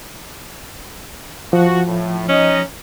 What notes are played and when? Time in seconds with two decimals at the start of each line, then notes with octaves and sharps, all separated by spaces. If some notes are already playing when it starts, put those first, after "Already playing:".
1.53 F3 F#4
1.87 A2
2.29 C#4 D#4 D#5